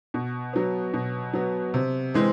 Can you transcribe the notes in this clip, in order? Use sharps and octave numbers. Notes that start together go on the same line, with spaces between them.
B2
F#3 B3
B2
F#3 B3
C3
E3 G#3 C4